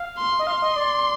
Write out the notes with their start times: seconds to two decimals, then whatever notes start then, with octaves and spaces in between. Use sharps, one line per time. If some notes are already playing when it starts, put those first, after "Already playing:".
Already playing: F5
0.18 C6
0.39 D#5
0.47 F5 C6
0.62 D#5
0.76 D5